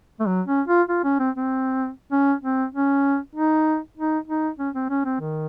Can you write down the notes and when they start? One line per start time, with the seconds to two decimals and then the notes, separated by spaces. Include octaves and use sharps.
0.20 A3
0.27 F#3
0.47 C#4
0.68 F4
0.89 F4
1.04 C#4
1.19 C4
1.35 C4
2.12 C#4
2.43 C4
2.74 C#4
3.35 D#4
3.97 D#4
4.28 D#4
4.59 C#4
4.75 C4
4.90 C#4
5.05 C4
5.21 D#3